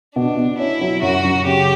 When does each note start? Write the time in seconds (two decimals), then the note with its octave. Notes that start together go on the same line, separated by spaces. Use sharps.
0.15 B2 D4
0.37 B2
0.59 C#4 E4
0.81 F#3
1.02 F#2 F#4
1.24 F#2
1.45 C#3 G4